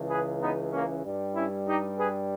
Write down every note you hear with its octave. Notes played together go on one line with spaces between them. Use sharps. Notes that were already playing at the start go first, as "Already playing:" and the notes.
Already playing: C#2 C#3 E3
G#4 B4
B3 D#4
A#3 C#4
G2 G3
C#4 E4
D#4 G4
G#4 B4